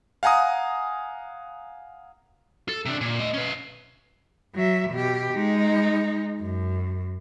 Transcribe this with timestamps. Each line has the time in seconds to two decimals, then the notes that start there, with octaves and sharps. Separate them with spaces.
0.23 F5 F#5 G#5 A#5 D#6
2.69 A4
2.85 C3 D4
3.01 A#2
3.19 A3 D#5
3.34 C#4 B4
4.55 F#3 E5
4.91 B2 G4
5.34 G#3 D#4
6.40 F#2